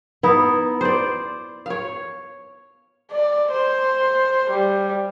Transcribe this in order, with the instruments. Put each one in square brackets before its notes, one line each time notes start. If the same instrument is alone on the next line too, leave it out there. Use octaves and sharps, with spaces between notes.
[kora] B3 D#4 E4
C5 D5
C#5 F5
[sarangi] D5
C5
G3